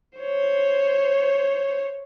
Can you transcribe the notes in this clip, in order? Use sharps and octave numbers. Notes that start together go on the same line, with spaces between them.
C5 C#5